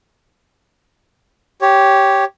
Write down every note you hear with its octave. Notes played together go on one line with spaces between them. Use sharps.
G4 C#5